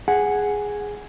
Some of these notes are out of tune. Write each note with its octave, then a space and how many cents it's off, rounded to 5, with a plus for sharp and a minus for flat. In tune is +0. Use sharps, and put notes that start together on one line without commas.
G#4 +0 F#5 +0